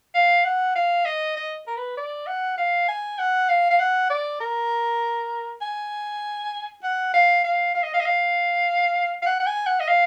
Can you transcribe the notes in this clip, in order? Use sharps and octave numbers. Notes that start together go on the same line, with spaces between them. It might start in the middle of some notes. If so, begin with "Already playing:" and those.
F5
F#5
F5
D#5
D#5
A#4
B4
D5
F#5
F5
G#5
F#5
F5
F5
F#5
D5
A#4
G#5
F#5
F5
F5
F5
D#5
F5
D#5
F5
F5
F#5
F#5
G#5
F#5
D#5
F5